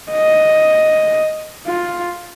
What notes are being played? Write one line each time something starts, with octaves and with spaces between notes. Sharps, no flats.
D#5
F4